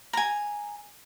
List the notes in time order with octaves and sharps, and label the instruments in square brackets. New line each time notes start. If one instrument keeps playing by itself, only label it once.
[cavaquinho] G#5 A#5